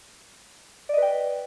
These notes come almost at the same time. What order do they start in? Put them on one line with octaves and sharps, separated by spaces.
D5 D#5 B4 G5